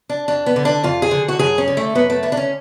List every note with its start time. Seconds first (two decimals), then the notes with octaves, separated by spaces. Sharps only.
0.09 D4
0.28 F2 D4
0.46 B3
0.56 D3
0.65 D4
0.83 F2 F4
1.02 G#4
1.11 D3
1.28 F#4
1.39 F#2 G#4
1.58 C#4
1.68 D3
1.77 A3
1.95 F#2 B3
2.10 A3
2.23 D3 B3
2.32 D4
2.37 C#4